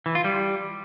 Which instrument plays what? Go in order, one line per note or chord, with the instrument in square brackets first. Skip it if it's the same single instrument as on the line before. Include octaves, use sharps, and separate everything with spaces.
[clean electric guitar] E3
F4
G3